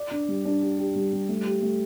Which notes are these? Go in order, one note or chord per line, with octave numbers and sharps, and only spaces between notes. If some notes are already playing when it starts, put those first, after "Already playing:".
Already playing: D5
D4
G3
D4
G4
G4
G3
G3
A3
G4
A3